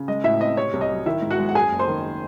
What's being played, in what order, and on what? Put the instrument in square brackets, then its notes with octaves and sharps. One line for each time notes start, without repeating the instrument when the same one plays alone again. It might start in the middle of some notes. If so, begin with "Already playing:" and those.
Already playing: [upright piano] C#3
G#3 D#5
A2 E4 E5
C4 D#5
C3 C#5
C2
D#5
F#3
D#3 E4 E5
G#2
F#4 F#5
G#3
F#5
F#2 G#4 G#5
F#1
C5 C6
D#3